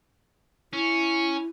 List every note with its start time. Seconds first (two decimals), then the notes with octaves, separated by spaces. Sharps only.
0.73 C#4 E4